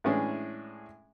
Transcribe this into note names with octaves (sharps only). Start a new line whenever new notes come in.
A2 E3 G#3 C#4 D4 G#4